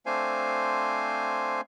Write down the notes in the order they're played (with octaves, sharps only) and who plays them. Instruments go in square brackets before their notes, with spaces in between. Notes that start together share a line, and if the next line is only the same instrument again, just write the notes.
[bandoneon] A3 C4 D4 C5 F5 G#5